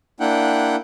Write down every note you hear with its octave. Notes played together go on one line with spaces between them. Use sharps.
A#3 D4 E4 F#5 G5